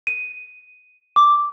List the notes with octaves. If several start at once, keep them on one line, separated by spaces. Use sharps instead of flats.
D#7
D6